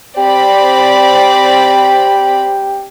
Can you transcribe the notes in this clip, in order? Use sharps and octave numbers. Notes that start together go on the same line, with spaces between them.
C4 G4 D5 B5